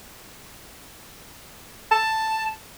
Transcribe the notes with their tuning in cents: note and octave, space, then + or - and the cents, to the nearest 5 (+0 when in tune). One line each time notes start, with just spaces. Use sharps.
A5 +5